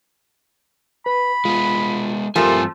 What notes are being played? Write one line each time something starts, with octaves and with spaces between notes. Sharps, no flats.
B4 B5
G#3 B3 F4
G2 F3 A3 C4 G4 A#4 G#5